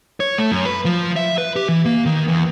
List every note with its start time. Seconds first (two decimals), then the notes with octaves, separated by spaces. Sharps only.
0.20 C#5
0.38 A3
0.52 F#2
0.66 B4
0.85 F3
1.16 E5
1.38 B4
1.56 G4
1.69 E3
1.86 A#3
2.06 D#3
2.28 E2